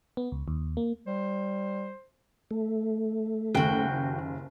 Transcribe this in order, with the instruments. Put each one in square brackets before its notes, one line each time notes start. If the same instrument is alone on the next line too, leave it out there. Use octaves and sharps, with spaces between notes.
[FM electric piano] B3
C#2
D#2
A#3
[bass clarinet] G3 [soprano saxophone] C5
[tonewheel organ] A3
[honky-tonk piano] F#1 D#2 [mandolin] F#4 G5